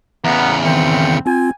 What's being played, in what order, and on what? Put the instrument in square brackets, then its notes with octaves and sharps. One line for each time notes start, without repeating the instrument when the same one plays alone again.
[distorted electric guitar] E2 C#3 [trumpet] B3 [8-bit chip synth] A#5 C#7
[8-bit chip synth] D#3 E3 C#7 [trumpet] C4
[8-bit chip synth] C4 F4 [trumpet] G#5